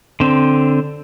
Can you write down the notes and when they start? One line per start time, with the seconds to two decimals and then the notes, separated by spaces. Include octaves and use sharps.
0.20 D3 C4